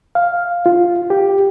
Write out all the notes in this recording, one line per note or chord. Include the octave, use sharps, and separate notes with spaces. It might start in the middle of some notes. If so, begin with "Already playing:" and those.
F5
F4
G4